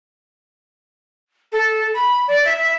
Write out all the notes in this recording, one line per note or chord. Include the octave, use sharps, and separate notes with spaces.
A4
B5
D5
E5
E5